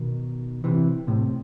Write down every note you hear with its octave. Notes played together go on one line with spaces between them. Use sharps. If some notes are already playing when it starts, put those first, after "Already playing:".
Already playing: B2 D#3
C3 E3
A2 C3